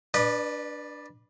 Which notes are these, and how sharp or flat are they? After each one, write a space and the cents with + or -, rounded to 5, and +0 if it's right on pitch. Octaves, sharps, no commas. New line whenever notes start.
D4 +0 B4 -15 D5 +45